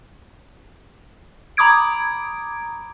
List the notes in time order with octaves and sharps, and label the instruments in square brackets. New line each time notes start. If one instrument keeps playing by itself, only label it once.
[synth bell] A#5 B5 D6 D#6 G#6 D7